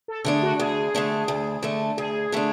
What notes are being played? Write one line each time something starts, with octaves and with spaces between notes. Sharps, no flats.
A4
D3 A3 D4 G#4
F#4
D2 G#4
D3 A3 D4
D2
D3 A3 D4
D2 G#4
D3 A3 D4